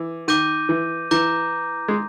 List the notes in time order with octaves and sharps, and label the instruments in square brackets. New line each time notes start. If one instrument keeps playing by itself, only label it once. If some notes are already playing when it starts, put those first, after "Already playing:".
Already playing: [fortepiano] E3 [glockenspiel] D6
[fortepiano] D#3 [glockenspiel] D6 G6 A#6 D#7
[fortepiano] E3
[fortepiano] E3 [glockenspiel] A#5 D6 G6 A#6
[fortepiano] G#3